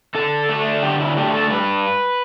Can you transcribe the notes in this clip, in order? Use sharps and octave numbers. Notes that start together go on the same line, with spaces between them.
D3 A4
A3 D4
D3 G4
E4
A3 D4 G4
A4
G2 B4